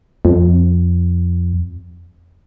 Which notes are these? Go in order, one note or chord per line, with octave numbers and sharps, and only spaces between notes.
F2